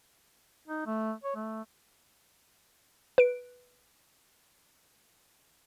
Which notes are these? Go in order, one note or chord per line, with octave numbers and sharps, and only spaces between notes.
D#4
A3
C#5
A3
B4 D7